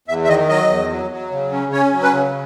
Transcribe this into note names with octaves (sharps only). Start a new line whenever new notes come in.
E2 E5
E5
D#3 D#5
F#3 D#5
E2
F#3
F#3
C#3
C#4
C#4 C#5
F#3
B4
C#3